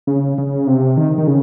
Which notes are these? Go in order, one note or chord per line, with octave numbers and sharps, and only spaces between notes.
C#3
C#3
C3
D#3
D#3
C#3